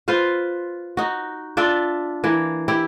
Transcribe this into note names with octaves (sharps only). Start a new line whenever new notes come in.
F4 B4 C5 F5
D#4 F#4
D4 F4 D5 E5
E3 A#3
E4 G4